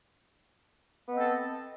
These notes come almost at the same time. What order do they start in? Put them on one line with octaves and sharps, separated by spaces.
B3 D#5 C4 A4